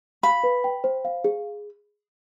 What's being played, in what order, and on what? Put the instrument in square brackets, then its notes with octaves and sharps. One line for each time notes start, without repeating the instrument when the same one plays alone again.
[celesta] F5 [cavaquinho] B5
[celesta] B4
G5
C5
F5
G#4